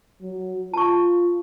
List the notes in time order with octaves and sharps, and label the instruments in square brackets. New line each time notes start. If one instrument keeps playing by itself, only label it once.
[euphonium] F#3
[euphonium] F4 [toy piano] A5 C#6